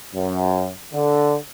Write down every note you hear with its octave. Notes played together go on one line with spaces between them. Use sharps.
F#2
D3